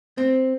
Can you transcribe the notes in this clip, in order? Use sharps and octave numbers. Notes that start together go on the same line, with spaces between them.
C4